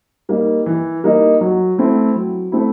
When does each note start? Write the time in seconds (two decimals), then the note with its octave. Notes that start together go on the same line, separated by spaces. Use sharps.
0.29 G3 A#3 D#4
0.66 E3
1.04 G3 A#3 D#4
1.41 F#3
1.78 A3 C4 E4
2.15 F#3
2.52 A3 C4 E4